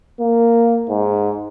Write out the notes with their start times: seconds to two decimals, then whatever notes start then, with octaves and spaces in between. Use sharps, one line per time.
0.20 A#3
0.89 G#2